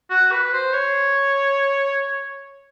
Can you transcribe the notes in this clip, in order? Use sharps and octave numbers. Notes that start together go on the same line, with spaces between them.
F#4
B4
C5
C#5